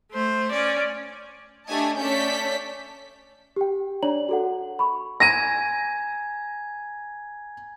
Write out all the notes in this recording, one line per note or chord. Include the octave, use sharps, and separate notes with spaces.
A3 C5
C#4 D5
A3 D4 G4 D#5 G#5 A5
A3 C#4 D5 A5 G6 B6
G4 G5
D4 C#5 D5 A#5 F#7
F#4 A4 F#5
B5 C#6
G#5 A#5 G#6 A#6 D#7